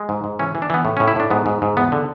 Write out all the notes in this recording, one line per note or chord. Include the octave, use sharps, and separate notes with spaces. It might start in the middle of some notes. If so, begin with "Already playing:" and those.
Already playing: G#3
G#2
G#2
E3 C#4
E3
D4
E3 B3
A2
A2 C#4
E4
A2 D4
G#2 B3
G#2
G#2
E2 B3
D3